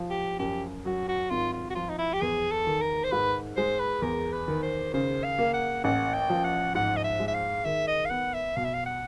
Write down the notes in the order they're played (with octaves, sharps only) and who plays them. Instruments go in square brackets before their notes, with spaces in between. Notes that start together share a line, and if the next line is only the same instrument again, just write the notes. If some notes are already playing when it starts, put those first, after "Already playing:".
Already playing: [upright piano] F3
[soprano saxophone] G4
[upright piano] F#2 [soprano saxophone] G4
[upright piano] F#3 [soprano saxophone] F#4
[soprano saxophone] F#4
[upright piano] G#1 [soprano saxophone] F4
[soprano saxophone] F4
F#4
[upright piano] F3 [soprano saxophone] F4
[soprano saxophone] D#4
E4
G4
[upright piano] E2 [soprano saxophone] G#4
[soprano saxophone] A4
[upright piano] D#3
[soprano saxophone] A#4
C5
[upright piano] G#2 [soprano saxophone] B4
[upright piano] G#3 [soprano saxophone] C5
[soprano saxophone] B4
[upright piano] E2 [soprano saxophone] A#4
[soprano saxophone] B4
[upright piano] D#3
[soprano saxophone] C5
[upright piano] C#3 [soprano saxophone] C5
[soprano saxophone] F5
[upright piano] A#3
[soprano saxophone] F#5
[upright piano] A1 [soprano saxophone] F#5
[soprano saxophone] G5
[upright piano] F3
[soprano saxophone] F#5
[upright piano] G#2 [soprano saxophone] F#5
[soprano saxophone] D#5
E5
[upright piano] G#3
[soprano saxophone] E5
F5
[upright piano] D#3 [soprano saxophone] E5
[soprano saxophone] D#5
F5
[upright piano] B3 [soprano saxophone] F#5
[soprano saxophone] E5
[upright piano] B2 [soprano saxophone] F5
[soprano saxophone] E5
F5
F#5